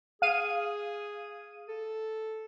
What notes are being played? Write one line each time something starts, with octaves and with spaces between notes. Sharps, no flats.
G#4 F5 D#7
A4